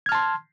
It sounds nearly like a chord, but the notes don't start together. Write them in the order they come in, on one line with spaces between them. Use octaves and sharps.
G#6 F6 A5 C6